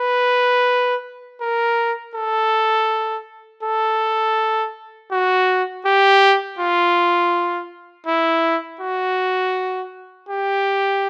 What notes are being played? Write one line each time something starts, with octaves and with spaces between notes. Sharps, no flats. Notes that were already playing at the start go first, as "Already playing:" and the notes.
Already playing: B4
A#4
A4
A4
F#4
G4
F4
E4
F#4
G4